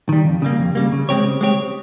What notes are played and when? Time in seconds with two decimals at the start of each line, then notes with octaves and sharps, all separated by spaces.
0.09 D#3 G3
0.25 F2
0.42 C#3 G3 A#3
0.59 F2
0.75 C#3 G3 A#3
0.92 C#3
1.09 G#3 C4 G4 C#5
1.24 C#3
1.41 G#3 C4 G4 C#5